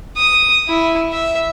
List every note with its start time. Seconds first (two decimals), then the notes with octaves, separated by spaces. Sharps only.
0.17 D#6
0.68 E4
1.12 E5